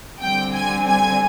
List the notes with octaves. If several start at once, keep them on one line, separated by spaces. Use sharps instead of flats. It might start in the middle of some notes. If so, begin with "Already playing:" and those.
D3 G3 C4 G5
G#5
G#5